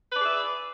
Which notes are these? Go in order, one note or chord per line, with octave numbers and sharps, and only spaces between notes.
G#4 B4 D5 E5